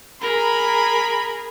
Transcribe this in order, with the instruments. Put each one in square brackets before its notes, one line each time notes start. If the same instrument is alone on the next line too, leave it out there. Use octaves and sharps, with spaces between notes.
[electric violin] G#4 A#4 [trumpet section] A#5 B5